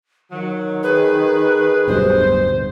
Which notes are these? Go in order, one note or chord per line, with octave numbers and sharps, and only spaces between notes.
D#3 F#3
G#4 B4
D1 G2 B2 C5